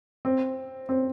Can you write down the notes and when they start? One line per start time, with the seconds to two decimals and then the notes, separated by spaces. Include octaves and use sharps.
0.25 C4
0.89 C4